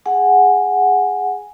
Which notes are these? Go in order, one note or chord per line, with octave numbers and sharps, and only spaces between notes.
G#4 F#5 G#5